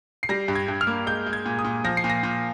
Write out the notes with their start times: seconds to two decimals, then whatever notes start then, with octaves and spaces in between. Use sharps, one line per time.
0.23 C7
0.29 G3 A#6
0.48 G2
0.55 G#6
0.68 G2
0.81 F6
0.87 A#3
1.07 G#3 G6
1.26 G#3
1.33 G#6
1.46 A#2
1.59 D#6
1.65 A#2
1.84 F3 A#6
1.97 C7
2.04 A#2
2.10 A#6
2.23 A#2